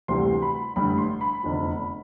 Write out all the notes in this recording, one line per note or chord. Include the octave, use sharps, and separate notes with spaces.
D2 C3 E3 G3 C6
B5
A1 G2 D3 B5
C6
B5
F1 E2 D3 F3